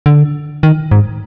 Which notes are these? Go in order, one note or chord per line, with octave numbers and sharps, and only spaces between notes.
D3
D#3
G#2